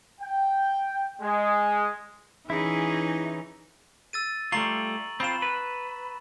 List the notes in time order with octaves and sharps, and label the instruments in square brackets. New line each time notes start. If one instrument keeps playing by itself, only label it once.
[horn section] G5
G#3
[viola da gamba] E3 [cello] C#4 D#4 [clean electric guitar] E4 [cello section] G#4
[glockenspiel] E6 A6 D#7
[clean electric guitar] G3 A3 F4 [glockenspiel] A#5 C#6 F#7
[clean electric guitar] C4 F4 [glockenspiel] B5 E7
[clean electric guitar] B4